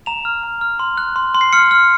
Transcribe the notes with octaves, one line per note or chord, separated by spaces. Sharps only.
A#5 F7
F6
A#5
F6
C6
F#6
C6
C6
C7
F6 C#7
F6